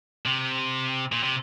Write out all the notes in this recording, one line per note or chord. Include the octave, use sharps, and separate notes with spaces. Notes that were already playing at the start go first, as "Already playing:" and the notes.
C3
A#2
C3